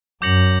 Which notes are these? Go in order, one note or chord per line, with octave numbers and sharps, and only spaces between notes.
F#2 D6 G6 A#6 C#7 F#7